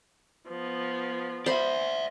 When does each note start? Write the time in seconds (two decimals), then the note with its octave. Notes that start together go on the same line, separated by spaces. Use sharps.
0.49 F3 B3
1.46 C5 D5 E5 B5